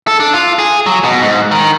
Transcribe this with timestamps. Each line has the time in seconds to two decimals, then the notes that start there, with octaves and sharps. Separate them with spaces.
0.07 A4
0.20 D4
0.33 F4
0.59 G#4
0.86 F#3
1.04 B2
1.22 G#2
1.52 D#3